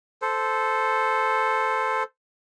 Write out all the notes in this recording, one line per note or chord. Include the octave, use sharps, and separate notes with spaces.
A4 C5